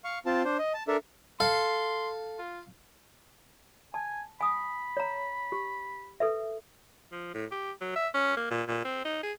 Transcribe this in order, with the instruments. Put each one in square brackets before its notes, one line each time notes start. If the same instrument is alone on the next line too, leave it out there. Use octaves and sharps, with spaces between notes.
[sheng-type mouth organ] F5 C#6
C4 F4 A5
D4 C5
D#5
A5
D4 A4 A#4 E5
[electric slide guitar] A4 [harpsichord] F5 [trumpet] C6
[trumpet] F4
[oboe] G#5 [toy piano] A5
[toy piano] G#5 D#6 [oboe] B5
[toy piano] C#5 A#5
G4
A4 B4 E5
[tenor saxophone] F3
A2
G4
F#3
E5
C#4
A#3
A#2
A#2
C4
D#4
G#4